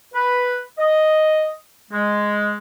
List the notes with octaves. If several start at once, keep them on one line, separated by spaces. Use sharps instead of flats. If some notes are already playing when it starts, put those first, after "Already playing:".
B4
D#5
G#3